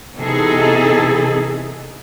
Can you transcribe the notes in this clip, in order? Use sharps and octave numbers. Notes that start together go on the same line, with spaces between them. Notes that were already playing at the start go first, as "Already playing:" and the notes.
C3 E3 B3 D#4 G#4 A4